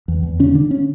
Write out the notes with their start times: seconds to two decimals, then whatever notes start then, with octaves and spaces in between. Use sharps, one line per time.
0.08 E2
0.23 E2
0.39 D3 C#4
0.55 D3 D4
0.71 C#4